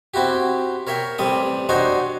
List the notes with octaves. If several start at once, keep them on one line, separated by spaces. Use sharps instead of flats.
C4 E4 F#4 G4
A#4 C#5 E5 G5
A1 G3 C4 D5 D#6
D4 D#4 F#4 C5 C#5 D#5